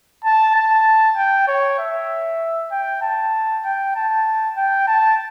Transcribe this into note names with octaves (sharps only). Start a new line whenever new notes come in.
A5
A5
G5
C#5
E5
G5
A5
G5
A5
G5
A5